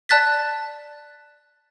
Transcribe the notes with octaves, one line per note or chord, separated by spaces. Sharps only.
D5 A5 F#6 A6 B6